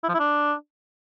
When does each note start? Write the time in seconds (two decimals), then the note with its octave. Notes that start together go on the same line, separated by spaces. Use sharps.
0.04 E4
0.09 F3
0.14 E4
0.19 D4